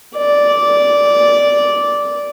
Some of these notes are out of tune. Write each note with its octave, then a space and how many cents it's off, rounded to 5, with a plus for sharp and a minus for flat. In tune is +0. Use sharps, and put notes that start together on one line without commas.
D5 -10